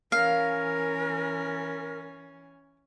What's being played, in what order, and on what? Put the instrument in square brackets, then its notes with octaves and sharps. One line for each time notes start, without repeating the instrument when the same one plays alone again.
[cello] E3 C#4 [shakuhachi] A#4 [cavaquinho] F5